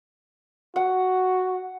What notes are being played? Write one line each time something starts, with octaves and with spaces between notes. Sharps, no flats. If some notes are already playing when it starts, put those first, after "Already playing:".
F#4 F#5